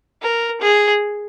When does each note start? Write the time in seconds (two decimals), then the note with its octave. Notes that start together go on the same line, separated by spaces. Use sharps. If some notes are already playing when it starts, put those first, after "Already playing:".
0.22 A#4
0.62 G#4